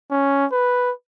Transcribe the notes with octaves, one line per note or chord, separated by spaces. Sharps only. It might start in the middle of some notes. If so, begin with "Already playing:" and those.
C#4
B4